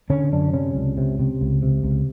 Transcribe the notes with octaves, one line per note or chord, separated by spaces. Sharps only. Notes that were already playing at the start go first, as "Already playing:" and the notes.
D3 C#4
F#2 D4
C3 C#4
C#2
C3
C3
C#2
C3
C#2